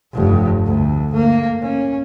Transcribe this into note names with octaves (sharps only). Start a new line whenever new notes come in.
F1 G2
D2
A#3
C#4